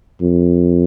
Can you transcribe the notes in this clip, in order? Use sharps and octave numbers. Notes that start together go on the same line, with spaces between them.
F2